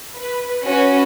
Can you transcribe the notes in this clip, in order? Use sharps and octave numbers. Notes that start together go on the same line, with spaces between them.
B4
C#4 F#4 B4